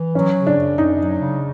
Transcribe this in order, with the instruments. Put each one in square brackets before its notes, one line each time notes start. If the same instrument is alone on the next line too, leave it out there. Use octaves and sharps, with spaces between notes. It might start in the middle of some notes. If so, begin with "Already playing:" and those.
Already playing: [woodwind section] E3
[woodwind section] F#3 [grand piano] C#4
[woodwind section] C#3
[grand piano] D4
[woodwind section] F#2
[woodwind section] F#2 [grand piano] D#4
[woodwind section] F#3
C#3